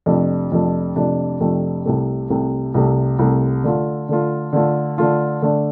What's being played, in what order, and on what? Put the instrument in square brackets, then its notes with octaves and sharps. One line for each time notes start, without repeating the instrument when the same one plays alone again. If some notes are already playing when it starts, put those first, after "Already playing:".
[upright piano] F2 C3 A3 D4
F2 C3 A3 D4
F2 C3 A3 D4
F2 C3 A3 D4
C2 C3 A3
C2 C3 A3
C2 C3 A3
C2 C3 A3
D3 A3 F4
D3 A3 F4
D3 A3 F4
D3 A3 F4
D3 A3 D4